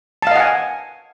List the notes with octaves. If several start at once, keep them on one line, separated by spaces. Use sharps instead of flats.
D#5 F5 F#5 G#5 A5